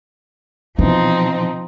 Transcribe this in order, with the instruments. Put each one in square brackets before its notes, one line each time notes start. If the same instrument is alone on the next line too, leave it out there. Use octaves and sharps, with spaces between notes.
[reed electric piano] B2 E3 [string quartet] F3 C4 D#4 [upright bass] D4